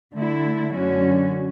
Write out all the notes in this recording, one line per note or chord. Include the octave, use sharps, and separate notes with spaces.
D3 A3 E4
F#2 D3 F#3 C#4 F#4